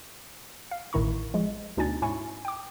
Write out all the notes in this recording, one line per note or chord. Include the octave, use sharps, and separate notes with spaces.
F5
A1 A2 D#3 E4 A#5 C#6
F3 G#3
D2 B2 D4 D#4 G#5 A6
G#2 C#4 E4 G#5 C#6
G5 D6